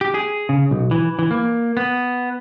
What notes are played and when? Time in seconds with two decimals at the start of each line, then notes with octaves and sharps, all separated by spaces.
0.01 G4
0.14 G#4
0.49 C#3
0.71 B1
0.91 E3
1.19 E3
1.31 A#3
1.77 B3